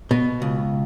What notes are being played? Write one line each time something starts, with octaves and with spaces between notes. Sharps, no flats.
B2
C#2